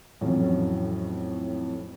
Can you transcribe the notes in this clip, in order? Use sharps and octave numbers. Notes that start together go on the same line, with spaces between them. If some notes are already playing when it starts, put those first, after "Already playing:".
F2 A2 E3 F#3 C#4